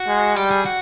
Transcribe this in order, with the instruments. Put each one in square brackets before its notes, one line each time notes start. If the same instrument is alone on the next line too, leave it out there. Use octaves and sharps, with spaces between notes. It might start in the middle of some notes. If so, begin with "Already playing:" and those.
Already playing: [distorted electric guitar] F#4
[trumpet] G#3
[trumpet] G3 [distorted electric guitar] G4
[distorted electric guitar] G#4
F#4